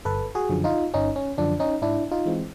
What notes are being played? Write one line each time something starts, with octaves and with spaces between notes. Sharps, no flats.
G1 A4 B4
F#4 G#4
F#2 D3 F3
D#4 F4
G1 C#4 D#4
C#4
F#2 D3 F3 D4
C#4 D#4
G#2 D4 E4
D#4 F4
E3 G#3 C4